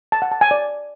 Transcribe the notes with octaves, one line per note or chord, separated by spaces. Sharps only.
A5
F#5
A5
G#5
D5